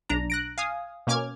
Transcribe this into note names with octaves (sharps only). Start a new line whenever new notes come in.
B1 D4 A#5
F#6 A#6 D7
F5 G#5 D#6
B2 A#3 C#4 D6 F6 G#6